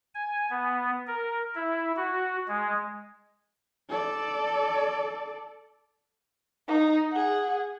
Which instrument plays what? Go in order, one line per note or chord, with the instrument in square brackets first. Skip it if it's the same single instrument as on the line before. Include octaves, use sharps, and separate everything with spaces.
[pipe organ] G#5
B3
A#4
E4
F#4
G#3
[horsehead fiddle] A4 D5
[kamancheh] D#4
G#4 F#5